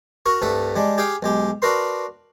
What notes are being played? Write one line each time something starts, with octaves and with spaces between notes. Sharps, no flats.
F#4 A#4 C#6
C2 G2 A3 E5 F#5
G3 G#3 D4
G4 G#4 F5 G5
B1 G#3 G4
D4 F#4 A#4 B4 C6